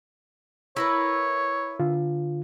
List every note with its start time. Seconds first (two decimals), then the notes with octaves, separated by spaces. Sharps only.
0.77 E4 A#4 B4 C#5
1.80 D3 F4